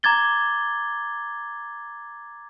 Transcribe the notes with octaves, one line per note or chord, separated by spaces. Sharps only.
A#5 D6 G#6 A6 G7